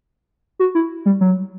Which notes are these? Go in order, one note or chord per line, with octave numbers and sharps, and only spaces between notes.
F#4
E4
G3
F#3